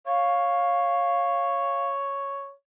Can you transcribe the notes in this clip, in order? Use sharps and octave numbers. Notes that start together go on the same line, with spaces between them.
C#5 F5